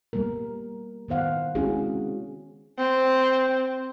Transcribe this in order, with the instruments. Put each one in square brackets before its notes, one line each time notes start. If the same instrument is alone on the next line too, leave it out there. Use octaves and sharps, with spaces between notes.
[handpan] G3 A#3 B3 A#4
D#3 B3 C5 F5 F#5
G#3 C4 C#4 E4 F#4 G#4
[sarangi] C4